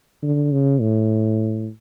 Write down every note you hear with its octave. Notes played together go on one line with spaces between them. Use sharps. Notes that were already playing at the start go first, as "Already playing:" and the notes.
D3
C#3
A2